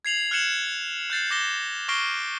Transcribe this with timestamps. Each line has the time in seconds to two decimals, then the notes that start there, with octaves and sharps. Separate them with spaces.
0.05 G#6 C7 F7 F#7
0.31 F6 F#6 G#6 C#7 E7 F#7
1.10 F#6 G6 A6 C7
1.31 D6 A#6 E7 G7
1.88 C#6 F6 A#6 C7 D7 G7